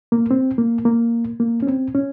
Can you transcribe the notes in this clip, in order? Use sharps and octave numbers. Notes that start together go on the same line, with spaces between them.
A#3
C4
A#3
A#3
A#3
C#4
C4
C#4